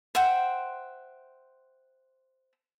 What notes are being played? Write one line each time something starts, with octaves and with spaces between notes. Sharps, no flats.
C5 E5 F#5 G5